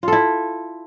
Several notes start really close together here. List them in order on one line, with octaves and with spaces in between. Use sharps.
F4 A4 E4